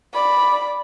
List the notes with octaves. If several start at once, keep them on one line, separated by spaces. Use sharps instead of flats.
D5 B5